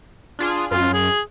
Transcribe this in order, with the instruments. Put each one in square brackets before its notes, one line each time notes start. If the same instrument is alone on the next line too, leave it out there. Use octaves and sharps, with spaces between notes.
[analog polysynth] D4 F4 G#4
[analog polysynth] F#2 [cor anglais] F4
[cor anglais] G#4